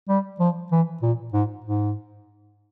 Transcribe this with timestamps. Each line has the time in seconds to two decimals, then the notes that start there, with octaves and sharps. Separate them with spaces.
0.09 G3
0.40 F3
0.72 E3
1.03 A#2
1.34 G#2
1.65 G#2